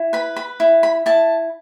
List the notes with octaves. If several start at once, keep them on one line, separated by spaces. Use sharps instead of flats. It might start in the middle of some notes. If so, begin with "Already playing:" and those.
Already playing: E4
B4 B5
B5
E4
B5
E4 A5